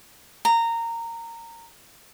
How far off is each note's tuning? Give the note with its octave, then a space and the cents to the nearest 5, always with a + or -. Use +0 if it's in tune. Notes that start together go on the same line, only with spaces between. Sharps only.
A#5 -15